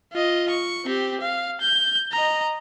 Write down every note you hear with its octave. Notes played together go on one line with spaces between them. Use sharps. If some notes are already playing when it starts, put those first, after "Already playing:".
F4 D#5
C#6
C4 G4
F5
G6
D#5 A#5